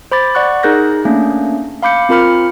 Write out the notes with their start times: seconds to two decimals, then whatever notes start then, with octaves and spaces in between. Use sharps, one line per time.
0.12 C5 B5 D6 A6
0.35 D5 F#5 C#6 F#6
0.63 D#4 G#4 A#4 F#6 G6 A#6
1.05 A3 A#3 C#4 D4
1.83 F5 B5 D6 G6 C#7
2.09 C4 F4 A#4 B5 F6 C#7